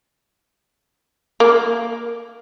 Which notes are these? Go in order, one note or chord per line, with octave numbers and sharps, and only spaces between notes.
A#3